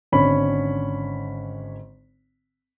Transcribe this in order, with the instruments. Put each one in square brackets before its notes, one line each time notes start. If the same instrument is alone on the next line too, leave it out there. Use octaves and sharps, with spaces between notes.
[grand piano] G#1 D3 C#4 B5